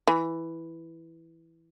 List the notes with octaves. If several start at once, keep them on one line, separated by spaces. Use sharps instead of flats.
E3